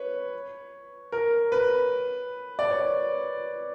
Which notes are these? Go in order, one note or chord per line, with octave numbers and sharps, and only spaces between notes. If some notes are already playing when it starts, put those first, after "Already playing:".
Already playing: B4 C#5
A#4
B4
D5
C#5